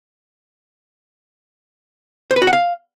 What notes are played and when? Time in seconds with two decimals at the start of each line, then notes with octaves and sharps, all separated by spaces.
2.31 C5
2.36 B4
2.42 F#4
2.47 F#5
2.53 F5